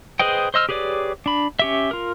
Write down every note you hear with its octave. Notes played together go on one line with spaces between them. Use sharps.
G#4 B4 C5 D#5 G5
C5 D#5 E6 F6
G4 G#4 B4 C#5 D5
D4 B5
C#4 G4 E5
F4 A#4